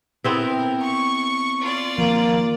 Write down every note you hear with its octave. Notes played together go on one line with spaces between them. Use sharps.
B3 C4 E4 A#4
C#6
F4 D5
D#3 F3 A#3